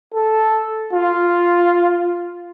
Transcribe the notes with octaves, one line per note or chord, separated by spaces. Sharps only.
A4
F4